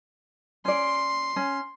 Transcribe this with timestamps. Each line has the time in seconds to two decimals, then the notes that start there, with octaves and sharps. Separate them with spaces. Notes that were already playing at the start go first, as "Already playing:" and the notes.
0.65 C#4 D5 C6
1.36 C#4